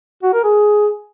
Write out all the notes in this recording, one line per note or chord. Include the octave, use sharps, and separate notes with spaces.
F#4
A#4
G#4